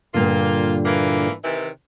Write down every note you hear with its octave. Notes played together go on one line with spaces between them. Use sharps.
G2 A#2 D3 A#3 F4
E3 A#3
C3 D#3 E3